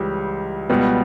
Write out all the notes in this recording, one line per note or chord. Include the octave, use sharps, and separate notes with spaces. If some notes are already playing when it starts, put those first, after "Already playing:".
Already playing: C#2 C#3 E3 G3 G4
C#2 B2 G3 B3